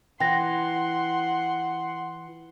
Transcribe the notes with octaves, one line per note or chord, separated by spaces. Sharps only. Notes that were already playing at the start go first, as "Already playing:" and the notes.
E3 F#5 G5 C6 A#6